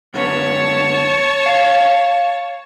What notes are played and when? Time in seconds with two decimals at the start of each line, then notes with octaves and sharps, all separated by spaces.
0.14 F#2 D3 B3 C#5 A5
1.46 F5